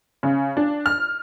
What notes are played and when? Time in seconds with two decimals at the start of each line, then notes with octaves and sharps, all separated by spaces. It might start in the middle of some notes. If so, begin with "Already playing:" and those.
0.23 C#3
0.57 D4
0.86 F6